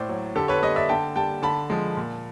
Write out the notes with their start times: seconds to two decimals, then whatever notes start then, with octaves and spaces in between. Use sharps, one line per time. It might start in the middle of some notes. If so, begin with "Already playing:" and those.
Already playing: A2 C5 D5
0.09 F#3
0.35 D3 G4 A4
0.48 B4 C#5
0.63 G3 C#5 D#5
0.76 D5 E5
0.89 D3 G5 A5
1.16 G3 G5 A5
1.42 D3 A5 B5
1.70 F3 G#3
1.97 A#2